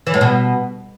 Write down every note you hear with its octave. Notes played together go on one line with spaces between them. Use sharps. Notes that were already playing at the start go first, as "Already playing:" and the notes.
E3
A2
B2